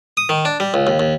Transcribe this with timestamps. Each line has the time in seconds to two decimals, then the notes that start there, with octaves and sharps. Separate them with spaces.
0.17 D#6
0.29 D#3
0.45 D4
0.60 G3
0.74 C#2
0.87 D#2
1.00 D#2